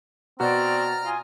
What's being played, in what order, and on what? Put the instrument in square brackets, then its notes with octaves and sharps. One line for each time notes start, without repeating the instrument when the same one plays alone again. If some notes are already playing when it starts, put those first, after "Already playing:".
[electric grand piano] B2 F#4 [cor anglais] C4 [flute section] D5 [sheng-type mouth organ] A#5 F6
[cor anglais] F4 [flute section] G#5 D#6